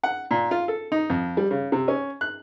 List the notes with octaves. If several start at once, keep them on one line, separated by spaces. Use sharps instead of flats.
F#5
A#2
F4
A4
D#4
F2
G3
C#3
C3
C#4
F#6